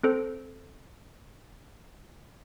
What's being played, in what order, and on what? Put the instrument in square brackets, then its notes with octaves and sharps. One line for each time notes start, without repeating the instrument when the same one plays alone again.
[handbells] C4 A4 C5